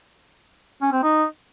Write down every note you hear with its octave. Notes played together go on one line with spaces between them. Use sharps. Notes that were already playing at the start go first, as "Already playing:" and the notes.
C#4
C4
D#4